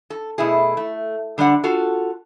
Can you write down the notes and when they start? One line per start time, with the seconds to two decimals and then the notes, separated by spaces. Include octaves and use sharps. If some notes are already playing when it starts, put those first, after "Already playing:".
0.10 A4
0.38 B2 A3 E4 G#4
0.77 A3
1.38 D3 G3 D4 D5 F#5
1.64 F4 F#4 A4